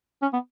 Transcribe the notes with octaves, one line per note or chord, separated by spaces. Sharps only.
C#4
B3